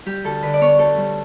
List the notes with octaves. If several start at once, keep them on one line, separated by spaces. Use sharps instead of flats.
G3 G4
D2 A4
D3 B4
D5
B3 C#5
D2 A4
G3